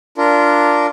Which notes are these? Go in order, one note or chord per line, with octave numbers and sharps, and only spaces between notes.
D4 F4 A#4